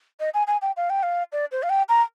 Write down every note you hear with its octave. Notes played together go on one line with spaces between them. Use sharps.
D#5
G#5
G#5
G5
F5
G5
F5
D5
C5
F5
G5
A#5